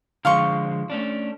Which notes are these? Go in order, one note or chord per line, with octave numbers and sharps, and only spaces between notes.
D3 F3 G#3 F5 C6 C#6
A3 C#4 D4